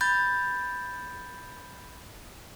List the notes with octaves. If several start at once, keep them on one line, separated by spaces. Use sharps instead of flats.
B5 G6 A6